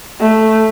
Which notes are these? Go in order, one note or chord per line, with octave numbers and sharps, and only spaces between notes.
A3